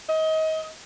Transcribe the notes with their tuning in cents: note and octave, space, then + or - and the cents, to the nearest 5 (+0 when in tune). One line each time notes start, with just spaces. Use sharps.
D#5 +30